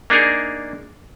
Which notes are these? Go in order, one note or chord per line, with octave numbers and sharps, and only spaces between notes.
A#3 D4 D#4 G#4 A#4